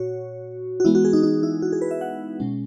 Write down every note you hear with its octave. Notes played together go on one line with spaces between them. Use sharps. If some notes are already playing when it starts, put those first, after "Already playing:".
Already playing: A#2 F#4 C#5
F#4
E3 G#3 B3 E4
F#4
G#4
D#4
D#4
E4
F#4
G#4
B4
E5
F#5
B2 G#3 C#4